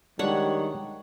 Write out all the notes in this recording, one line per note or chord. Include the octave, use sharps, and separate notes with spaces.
D#3 G3 G#3 D4 C#5 F#5